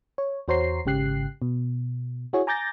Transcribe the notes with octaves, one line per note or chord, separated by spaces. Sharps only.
C#5
E2 F#4 C5 C#5 A#5 C7
G#1 G#2 C#3 G4 F#6 C7
B2
E4 F#4 G#4 C#5
G#5 A#5 D6 G6 A6 A#6